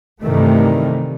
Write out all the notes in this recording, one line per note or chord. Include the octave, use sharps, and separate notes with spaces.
G2 C3 D#3 E3 G3 A3